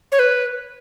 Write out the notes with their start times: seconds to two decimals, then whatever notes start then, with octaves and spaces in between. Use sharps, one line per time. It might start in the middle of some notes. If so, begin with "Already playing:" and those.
0.12 C#5
0.19 B4